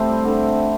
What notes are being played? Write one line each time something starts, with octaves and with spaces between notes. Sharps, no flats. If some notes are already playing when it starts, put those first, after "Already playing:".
Already playing: A3 C4 E4 G4
G3
D3